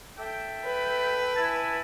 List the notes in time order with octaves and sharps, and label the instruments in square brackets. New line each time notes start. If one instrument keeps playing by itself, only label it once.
[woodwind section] A4 E5 G5
[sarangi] B4
[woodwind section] E4 G#5 A5